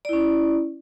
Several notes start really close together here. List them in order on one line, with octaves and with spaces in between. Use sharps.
D5 E4 C#4